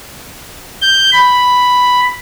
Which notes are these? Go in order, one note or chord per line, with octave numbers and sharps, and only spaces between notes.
G6
B5